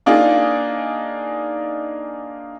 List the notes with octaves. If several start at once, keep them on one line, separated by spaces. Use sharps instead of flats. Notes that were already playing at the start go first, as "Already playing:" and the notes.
A#3 D4 D#4 F4 G#4